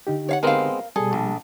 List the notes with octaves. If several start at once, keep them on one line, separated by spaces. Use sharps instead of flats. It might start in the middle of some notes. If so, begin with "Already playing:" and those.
D3 D#4 G4
C#5 F5 F#5
G#3 B3 C4 A#4 F5
B2 G3 G#4 A4
A#1